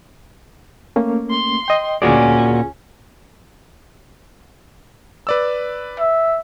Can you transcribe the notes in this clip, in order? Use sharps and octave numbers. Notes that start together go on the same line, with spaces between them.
A3 A#3 C#4
C6
D#5 G5
D2 A#2 C#4 F4 F#4 G#4 D5
B4 D5 E6
E5